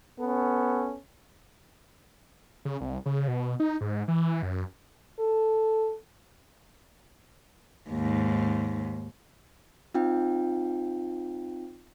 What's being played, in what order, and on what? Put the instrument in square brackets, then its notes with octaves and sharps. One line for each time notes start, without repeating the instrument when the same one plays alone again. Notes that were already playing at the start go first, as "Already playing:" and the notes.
[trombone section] B3 C#4 A4
[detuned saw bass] C#3
C2
C#3
B2
D#4
G#2
E3
F#2
[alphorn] A4
[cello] D#2 G#2
[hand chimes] C4 D#4 F4 G5